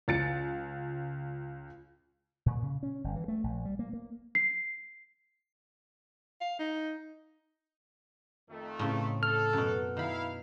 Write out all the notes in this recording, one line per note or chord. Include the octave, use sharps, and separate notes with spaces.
C#2 A6 C#7
A#2
C#3
C#4
G1
E3
A3
A#1
G3
A#3
A#3
C7
F5
D#4
F2 D#3 A3
A2 C#3 C4
A4 F6
F#2 B2
D#3 E4 F5 B5